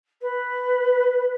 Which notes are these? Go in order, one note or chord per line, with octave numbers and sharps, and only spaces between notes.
B4